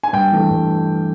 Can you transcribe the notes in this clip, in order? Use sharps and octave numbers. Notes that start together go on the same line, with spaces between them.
G#5
G2 G5
E3 A3
G2